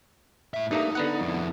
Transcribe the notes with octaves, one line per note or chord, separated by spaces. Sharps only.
A2 E5
G2 A3 A#3 D#4
D3 B3 F#5
F2 E4